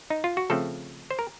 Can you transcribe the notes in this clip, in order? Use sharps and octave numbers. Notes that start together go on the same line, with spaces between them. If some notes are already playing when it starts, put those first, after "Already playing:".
D#4
F4
F#4
C#3 F3 A3 C4 A4
C5
A#4